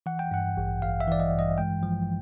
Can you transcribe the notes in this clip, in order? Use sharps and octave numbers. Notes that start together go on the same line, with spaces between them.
E3 F#5
G5
G2 F#5
A1
A1 F5
E5
E3 D5
D#5
G2
D#5
G#3 G5
F3